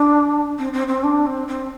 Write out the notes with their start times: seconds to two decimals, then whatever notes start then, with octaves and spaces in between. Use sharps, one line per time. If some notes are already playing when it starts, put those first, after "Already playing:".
Already playing: D4
0.59 C4
0.73 C4
0.87 C4
1.04 D4
1.26 C4
1.48 C4